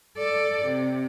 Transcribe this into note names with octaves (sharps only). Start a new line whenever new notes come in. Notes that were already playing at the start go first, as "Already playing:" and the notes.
A4 D5
C3